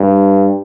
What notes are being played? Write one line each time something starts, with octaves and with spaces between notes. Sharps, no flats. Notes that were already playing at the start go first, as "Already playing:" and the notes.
Already playing: G2